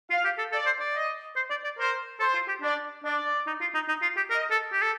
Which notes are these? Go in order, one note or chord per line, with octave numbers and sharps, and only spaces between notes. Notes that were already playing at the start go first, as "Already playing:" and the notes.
F4 F5
G4
A4
A4 D5
C5
D5
D#5
C5
D5
D5
A#4 C5
A4 C5
F4
G4
D4 D5
D4 D5
D#4
F4
D#4
D#4
F4
G4
A#4 D#5
A4
G4
A4